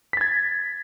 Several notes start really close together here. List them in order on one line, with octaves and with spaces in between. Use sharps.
B6 A6 G#6